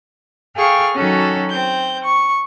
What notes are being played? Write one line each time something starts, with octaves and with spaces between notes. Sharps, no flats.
G#4 A4 F5 G5 C#6 F6
D#3 F#3 C#4 F#4 A4
C4 G6
C#6